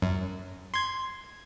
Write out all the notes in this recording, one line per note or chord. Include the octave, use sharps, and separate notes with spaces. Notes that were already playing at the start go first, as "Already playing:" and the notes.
F#2
C6 G#6